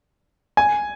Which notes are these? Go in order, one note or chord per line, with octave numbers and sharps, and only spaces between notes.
G#5